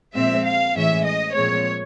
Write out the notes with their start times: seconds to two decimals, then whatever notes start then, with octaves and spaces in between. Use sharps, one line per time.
0.15 A#2 F3 G#3 C4 E5
0.45 F5
0.75 A2 E3 G#3 C#4 E5
1.05 D#5
1.35 A#2 F3 G#3 C4 C#5